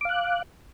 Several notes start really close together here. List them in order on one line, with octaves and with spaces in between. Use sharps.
D6 F5 F#6